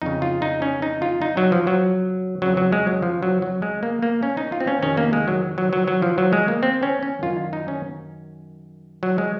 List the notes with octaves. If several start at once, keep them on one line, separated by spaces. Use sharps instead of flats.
F2 C#3 D#4
F4
D#4
C#4
D#4
F4
D#4
F#3
F3
F#3
F2 C#3 F#3
F#3
G#3
F#3
F3
F#3
F#3
G#3
A#3
A#3
C#4
D#4
F4
C4
C#4
F2 C3 D#3 C#4
A#3
G#3
F#3
F#3
F#3
F#3
F3
F#3
G#3
A#3
C4
C#4
C#4
F#2 D#3 F4
D#4
C#4
F#3
G#3